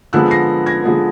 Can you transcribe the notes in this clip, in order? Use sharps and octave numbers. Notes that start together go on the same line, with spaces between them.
D3 F3 G#3 B3 E6 F#6
A#6 C7
G#6 A#6
D3 F3 G#3 B3